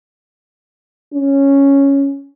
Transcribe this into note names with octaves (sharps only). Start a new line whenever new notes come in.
C#4